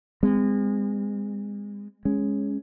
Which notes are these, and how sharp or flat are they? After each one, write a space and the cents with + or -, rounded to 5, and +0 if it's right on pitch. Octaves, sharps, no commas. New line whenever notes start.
G#3 -30 C4 -30
G#3 +0 C#4 +0